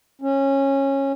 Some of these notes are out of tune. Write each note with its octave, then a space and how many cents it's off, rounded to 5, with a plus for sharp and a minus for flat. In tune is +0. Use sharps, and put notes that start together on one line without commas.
C#4 -20